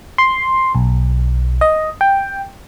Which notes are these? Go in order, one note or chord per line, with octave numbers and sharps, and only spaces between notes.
C6
B1
D#5
G5